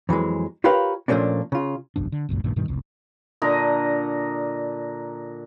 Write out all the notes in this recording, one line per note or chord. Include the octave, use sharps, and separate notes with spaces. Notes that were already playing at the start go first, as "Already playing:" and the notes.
F2 E3 F#3 G#3
F4 G4 A#4 B4 C#5 F5
A#2 F3 A3 A#3 C#4 D4
C#3 F4
G1 C2 F#2 D4
D3
G1 C#2 F#2 A#2
A#1 G2 A#2 D#3
G2 B2 D#3 G3
F1 C2
A#2 D3 D#5 A#5